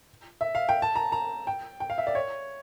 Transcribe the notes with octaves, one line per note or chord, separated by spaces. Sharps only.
E5
F5
G5
A5
A#5
A#5
G5
G5
F5
E5
D5
C#5